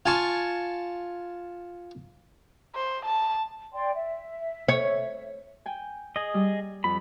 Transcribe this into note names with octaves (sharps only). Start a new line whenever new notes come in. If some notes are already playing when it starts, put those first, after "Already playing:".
F4 G#5 A5 C#6
C5
A5
D5 G5 C6
E5
C#5
G5 G#5
G#4 D#5
G3
F2 B5